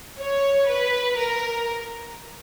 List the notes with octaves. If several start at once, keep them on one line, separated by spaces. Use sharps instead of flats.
C#5
B4
A#4